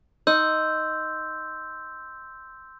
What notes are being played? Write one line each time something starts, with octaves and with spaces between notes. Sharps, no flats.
D#4 C6 E6 G6